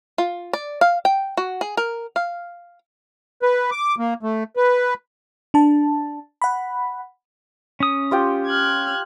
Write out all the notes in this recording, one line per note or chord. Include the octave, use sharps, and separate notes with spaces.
F4
D5
F5
G5
F#4
G#4
A#4
F5
B4
D6
A#3
A3
B4
D4 A5
F#5 B5
C#4 D#6
F4 G4 G5
F6 F#6 G#6